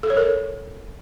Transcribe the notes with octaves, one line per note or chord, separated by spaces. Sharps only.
A4
C#5
A#4